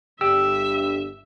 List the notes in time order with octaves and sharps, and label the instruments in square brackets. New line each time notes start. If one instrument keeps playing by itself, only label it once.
[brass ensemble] G1 G2 [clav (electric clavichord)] G4 D5 [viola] E5 [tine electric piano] E6